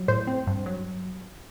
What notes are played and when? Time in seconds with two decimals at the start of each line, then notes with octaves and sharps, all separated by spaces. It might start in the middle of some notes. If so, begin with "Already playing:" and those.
Already playing: F#3
0.08 A2 C5
0.27 C4
0.47 G2
0.66 F#3